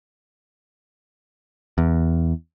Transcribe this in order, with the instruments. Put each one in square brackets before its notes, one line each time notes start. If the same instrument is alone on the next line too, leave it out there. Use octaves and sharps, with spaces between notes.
[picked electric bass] E2